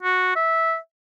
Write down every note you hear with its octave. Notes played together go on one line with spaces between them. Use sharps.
F#4
E5